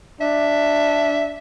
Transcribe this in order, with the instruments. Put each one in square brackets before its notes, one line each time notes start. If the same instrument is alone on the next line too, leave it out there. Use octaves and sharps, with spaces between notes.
[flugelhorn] D4 [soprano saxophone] E5